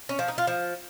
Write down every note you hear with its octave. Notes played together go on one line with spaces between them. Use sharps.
C#4
F3
D#4
F4
F3